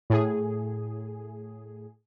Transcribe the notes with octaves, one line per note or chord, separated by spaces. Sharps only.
A2 G#4